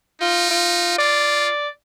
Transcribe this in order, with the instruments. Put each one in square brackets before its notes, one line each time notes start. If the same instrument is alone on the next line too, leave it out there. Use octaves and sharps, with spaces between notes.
[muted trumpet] D#4 [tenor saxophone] F4
[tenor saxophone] F4
[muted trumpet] F4 [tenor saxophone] D5